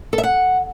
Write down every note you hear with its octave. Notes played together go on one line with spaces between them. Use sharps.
A4
E5
F#5